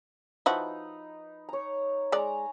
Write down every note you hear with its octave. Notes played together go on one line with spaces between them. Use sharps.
F3 D#4 E4 F#4 B4 A#5
C#5 A#5
G#3 D5 G#5 A#5